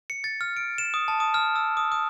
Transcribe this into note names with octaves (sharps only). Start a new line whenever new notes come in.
C#7
A6
F6
D7
E7
D#6
A5
D#6
F6
E6
D#6
D#6